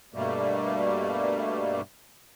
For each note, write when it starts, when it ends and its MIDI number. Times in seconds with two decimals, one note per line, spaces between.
0.14 1.81 43
0.14 1.81 47
0.14 1.81 55
0.14 1.81 57
0.14 1.81 58